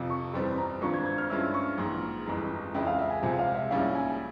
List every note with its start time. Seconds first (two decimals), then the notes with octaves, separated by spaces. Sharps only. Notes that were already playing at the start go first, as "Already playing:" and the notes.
Already playing: F2 C3 F3
0.10 C#6
0.33 G1 F2 E3 G3 C4 C6
0.58 A#5
0.81 G#1 G2 F3 C4 C#6
0.93 G#6
1.06 G#6
1.18 F6
1.30 G2 F3 G#3 C#4 E4 E6
1.54 C#6
1.78 A#1 G#2 E3 C6
2.26 G1 F2 E3 G#3 A#5
2.74 F2 C#3 E3 G#3 E4 G5
2.87 F5
2.98 E5
3.10 G#5
3.22 C#2 C3 F3 G#3 C4 G#5
3.39 F5
3.55 E5
3.71 A#1 G#2 G3 C#4 E4 F5
3.95 G#5